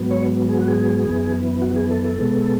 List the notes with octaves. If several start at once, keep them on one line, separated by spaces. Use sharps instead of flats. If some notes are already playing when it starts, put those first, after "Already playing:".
Already playing: G#2 F#3 B3
C#5
G#4
F#4
G#4
F#2 E3 B3
F#4
G#4
A4
A4
B2 G#3 B3